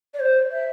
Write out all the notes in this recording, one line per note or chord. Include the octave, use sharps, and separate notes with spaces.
D5
C5
E5